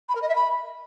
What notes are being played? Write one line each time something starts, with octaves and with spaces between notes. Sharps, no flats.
B5
A#4
D#5
E5
B5